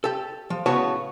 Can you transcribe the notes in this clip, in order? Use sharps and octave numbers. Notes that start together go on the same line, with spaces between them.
G4 A4
F3
A2 C#3 B3 F#4 C#5 A5